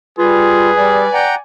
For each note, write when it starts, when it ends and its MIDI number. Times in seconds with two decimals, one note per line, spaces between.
0.19 0.71 55
0.19 0.71 65
0.19 1.03 68
0.19 1.26 71
0.77 1.07 55
0.77 1.43 74
0.77 1.43 80
1.14 1.35 78
1.14 1.35 79
1.14 1.35 82